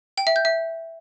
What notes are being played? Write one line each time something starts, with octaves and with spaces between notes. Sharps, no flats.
G5
E5
G6
E5